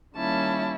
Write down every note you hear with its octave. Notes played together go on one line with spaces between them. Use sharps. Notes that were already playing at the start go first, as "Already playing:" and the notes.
D#3 G3 A#3 C#4 E4 A5